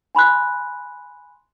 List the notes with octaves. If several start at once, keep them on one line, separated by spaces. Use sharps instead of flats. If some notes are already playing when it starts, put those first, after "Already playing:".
G#5 B5 C6 F#6